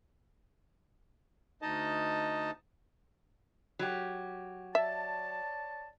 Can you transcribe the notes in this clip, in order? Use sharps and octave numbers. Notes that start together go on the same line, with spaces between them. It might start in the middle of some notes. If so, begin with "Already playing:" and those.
D2 D#4 D#5 A5
F#3 G4
C#5 D5 E5 A5